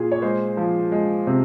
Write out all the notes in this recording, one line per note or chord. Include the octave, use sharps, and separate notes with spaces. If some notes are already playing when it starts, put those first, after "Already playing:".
Already playing: A#2 G#4
C#5
G#3 C5
F3
G#3
C3